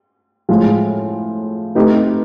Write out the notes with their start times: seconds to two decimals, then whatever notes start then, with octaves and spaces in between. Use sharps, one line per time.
0.49 A2 F3 G#3
1.75 A3 C4 D#4 G4 B4